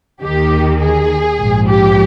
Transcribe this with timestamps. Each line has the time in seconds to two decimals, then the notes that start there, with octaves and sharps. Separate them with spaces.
0.22 D#2 D#3 G4
0.81 G#4
1.39 A#1 G#2 F3
1.68 G4